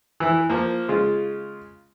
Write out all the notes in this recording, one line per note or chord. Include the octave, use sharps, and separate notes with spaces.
E3 E4
F3 A#3
C#3 G#3 F4